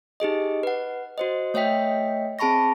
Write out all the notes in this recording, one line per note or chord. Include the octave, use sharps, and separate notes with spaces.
D#4 G4 G#4 D#5
B4 F#5
F#4 C5 D#5
A3 C#5 D#5 E5 G5 B6
C4 G#4 A5 B5 C#6 A#6